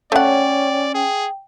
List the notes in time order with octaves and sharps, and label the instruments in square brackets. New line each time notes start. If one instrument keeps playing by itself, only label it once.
[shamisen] A3 F#5 [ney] C#4 [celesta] C#5 G5 [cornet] D5
[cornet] G#4 [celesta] G5